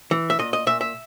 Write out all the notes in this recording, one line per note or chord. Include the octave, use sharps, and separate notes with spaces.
E3
E5
A#2 D#5
D#5
A#2 E5
E5